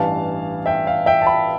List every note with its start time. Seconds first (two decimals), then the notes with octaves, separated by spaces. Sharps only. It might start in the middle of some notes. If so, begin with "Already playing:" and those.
Already playing: A1 G2 E3 F5 A5
0.66 E5 G5
0.87 F5
1.06 E5 G5
1.22 A5
1.27 G5 B5